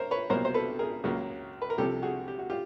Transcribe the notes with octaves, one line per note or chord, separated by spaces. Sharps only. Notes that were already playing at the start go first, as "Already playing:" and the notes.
Already playing: A#4 C5 C#5
B4 C#5
C2 B2 F#3 A#3 A#4 C5
C5
A4 B4
G#4 A#4
C#2 C#3 F#3 A#3
B4
A#4
C2 C3 F3 G4 A4
F#4 G#4
G4
F#4
F4 G4